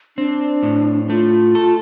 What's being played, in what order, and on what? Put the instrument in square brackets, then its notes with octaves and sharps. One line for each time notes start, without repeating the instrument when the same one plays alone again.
[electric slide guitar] C4 [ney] D4
[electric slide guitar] A2
[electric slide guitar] A3 [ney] F4
[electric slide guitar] A4